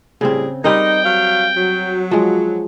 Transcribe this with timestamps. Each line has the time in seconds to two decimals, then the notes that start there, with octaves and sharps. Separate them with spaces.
0.21 A2 C#3 G3 C4 G#4
0.64 G3 C4 D#4 A#4 D#5 G5
1.04 F#3 F5
1.57 F#3
2.11 F3 G#3